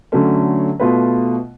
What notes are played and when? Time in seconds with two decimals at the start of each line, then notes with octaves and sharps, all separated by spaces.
0.12 D3 F#3 A3 C#4
0.80 B2 A3 F4 B4